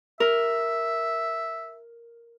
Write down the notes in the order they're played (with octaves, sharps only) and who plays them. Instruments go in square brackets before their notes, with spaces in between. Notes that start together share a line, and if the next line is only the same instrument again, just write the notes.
[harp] A#4 [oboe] E5